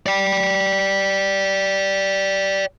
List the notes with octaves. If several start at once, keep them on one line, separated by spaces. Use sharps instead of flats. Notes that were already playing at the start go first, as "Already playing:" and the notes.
D5 G5